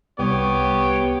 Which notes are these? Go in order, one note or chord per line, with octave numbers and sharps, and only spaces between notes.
C2 B3 G4 C#5